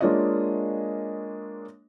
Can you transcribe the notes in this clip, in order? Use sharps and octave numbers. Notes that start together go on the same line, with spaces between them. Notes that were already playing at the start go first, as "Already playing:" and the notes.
G#3 A#3 D4 F4 C#5 D#5